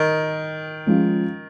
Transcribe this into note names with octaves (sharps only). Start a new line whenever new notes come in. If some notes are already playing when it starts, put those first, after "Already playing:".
Already playing: D#3
F3 G#3 C#4 F4